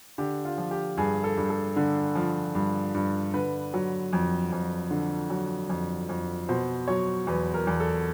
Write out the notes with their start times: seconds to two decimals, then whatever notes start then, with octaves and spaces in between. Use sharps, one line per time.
0.18 D3 G4
0.45 F4
0.58 F3
0.71 G4
0.97 G2 G#4
1.24 A4
1.37 G2
1.50 A4
1.76 D3
2.15 F3
2.55 G2
2.94 G2
3.34 D3 B4
3.74 F#3
4.13 F2
4.52 F2
4.91 D3
5.30 F#3
5.69 F2
6.09 F2
6.48 B2 C5
6.88 F#3 C#5
7.27 E2 B4
7.54 A#4
7.67 E2
7.80 A4